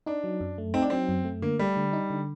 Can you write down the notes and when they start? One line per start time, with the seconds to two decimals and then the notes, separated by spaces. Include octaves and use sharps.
0.06 D4 D#4
0.24 F#3
0.41 F#2
0.58 A3
0.74 C4 D#4
0.82 D4
0.90 F#3 C4
1.09 F#2
1.25 A3
1.42 D3 A#3
1.59 G3 A3
1.77 D3
1.93 D#4
2.10 D3